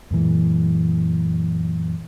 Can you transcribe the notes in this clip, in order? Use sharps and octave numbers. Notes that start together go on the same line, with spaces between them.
F#2 A#2 E3 G#3